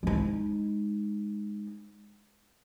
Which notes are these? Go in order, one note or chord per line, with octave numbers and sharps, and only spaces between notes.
G#3 D#4